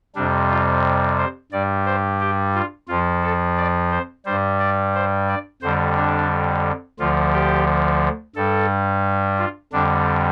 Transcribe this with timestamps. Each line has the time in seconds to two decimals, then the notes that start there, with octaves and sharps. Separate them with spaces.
0.15 F2 C3 G3 D4
0.50 F4
1.17 C5
1.52 G2 G3 D5
1.85 C5
2.20 G4
2.55 F4
2.88 F2 F3 F4
3.23 A4
3.57 D5
3.91 C5
4.25 G2 G3 C5
4.60 D5
4.94 C5
5.28 D5
5.62 F2 D3 G3 C5
5.96 D4
6.99 D2 D3 F3 F4
7.33 G4
8.35 G2 G3 A4
9.38 F4
9.73 F2 D3 G3 D4